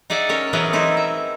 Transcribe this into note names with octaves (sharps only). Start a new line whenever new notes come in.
D#4 G#4 D5 E5 F#5
C#4 A#4 C#5
E3 F#3 B3 C#4 G#4 A#4
C4 D#4 E4
E5